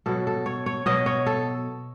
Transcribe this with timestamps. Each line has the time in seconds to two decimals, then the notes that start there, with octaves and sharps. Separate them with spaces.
0.06 B2 F#3 A4
0.27 A4
0.46 C#5
0.66 C#5
0.86 B2 F#3 D#5
1.06 C#5
1.26 A4